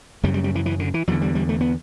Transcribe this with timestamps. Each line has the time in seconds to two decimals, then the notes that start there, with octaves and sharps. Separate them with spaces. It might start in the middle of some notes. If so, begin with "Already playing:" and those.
0.24 F#2 C#3 G3
0.34 G3
0.44 G3
0.55 E3
0.66 E3
0.79 D3
0.94 E3
1.08 E2 D3 F#3
1.22 G3
1.35 G3
1.49 A3
1.61 B3